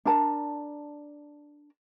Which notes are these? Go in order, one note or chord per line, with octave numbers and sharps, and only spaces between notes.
D4 A#4 A5 A#5